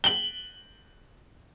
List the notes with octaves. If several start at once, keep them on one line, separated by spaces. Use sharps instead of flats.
F#7 G7